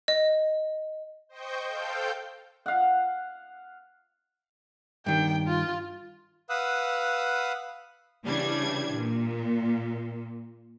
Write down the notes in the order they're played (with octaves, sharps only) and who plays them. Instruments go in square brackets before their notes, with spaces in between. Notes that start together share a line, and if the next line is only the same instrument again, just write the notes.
[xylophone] D#5
[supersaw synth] C5 D#5 G5 C#6 G6
A4 C5 F5 G5 G6
[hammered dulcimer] F5 F#5
[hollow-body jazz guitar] G2 D#3 [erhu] G5
[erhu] F4
[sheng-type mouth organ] B4 F5 F#5 D#6 E6 F#6
[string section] C#3 E3 G3 D4 G#6
A#2